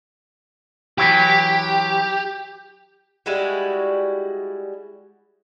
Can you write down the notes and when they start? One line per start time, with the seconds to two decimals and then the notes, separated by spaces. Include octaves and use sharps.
0.98 E3 F#3 E4 G4
3.26 G3 G#3 E4 F#4